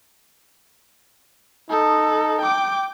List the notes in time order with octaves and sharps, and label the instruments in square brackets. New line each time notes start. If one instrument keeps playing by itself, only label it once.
[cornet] D#4 [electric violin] A4
[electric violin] G5 D6